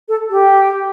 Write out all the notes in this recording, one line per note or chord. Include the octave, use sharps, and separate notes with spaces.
A4
G4